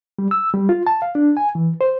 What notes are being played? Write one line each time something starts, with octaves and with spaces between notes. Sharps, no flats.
G3
E6
G3
F4
A5
F5
D4
G#5
E3
C5